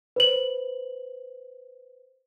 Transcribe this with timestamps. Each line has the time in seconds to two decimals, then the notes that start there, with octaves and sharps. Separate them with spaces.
0.16 B4 C5 F#7